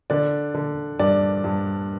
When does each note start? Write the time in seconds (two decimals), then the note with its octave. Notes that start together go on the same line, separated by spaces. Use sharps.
0.10 D3 D5
0.54 D3
0.99 G2 D5
1.44 G2